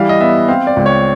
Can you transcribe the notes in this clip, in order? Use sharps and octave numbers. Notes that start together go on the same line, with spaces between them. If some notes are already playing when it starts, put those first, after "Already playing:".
Already playing: E3 G3 F5
D#5
B3 E5
C4 F5
D5
C#2
C#5